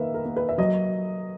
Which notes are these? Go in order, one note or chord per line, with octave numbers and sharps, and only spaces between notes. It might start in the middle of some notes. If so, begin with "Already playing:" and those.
Already playing: D#3 A#3 B4 D#5 E5
A#4
A#3
B4
E5
F#3 D#5